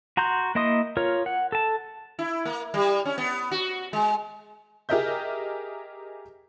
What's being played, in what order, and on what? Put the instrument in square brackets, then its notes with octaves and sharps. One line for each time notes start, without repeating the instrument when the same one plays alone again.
[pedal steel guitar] F#4 A#5 C6 G6
A#3 E4 D#5 C6 D#6
F4 A#4 C#5
F#5
A4 A5
[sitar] E4
A#3
G3
C#4
B3
F#4
G#3
[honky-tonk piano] G4 G#4 A#4 D#5 E5 G6